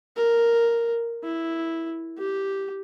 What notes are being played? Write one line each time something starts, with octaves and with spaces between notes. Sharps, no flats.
A#4
E4
G4